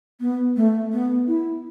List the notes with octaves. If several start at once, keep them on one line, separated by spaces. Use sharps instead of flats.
B3
A3
B3
E4